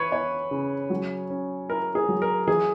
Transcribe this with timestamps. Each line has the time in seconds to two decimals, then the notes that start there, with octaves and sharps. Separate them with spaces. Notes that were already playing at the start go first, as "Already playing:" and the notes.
Already playing: E3 B4 C#5
0.12 B3 C#5
0.51 C#3
0.90 F#3
1.30 C#4
1.69 E4 A#4
1.95 G#4
2.09 F#3
2.22 A#4
2.47 E3 G#4